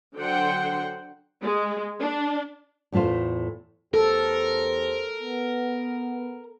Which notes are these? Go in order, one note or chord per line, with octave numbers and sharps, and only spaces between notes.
D3 F#3 C5 F#5 G5 C6
G#3
D4
E2 A2 A3 F4 C5
E2 G4 A4 A#4 C5
B3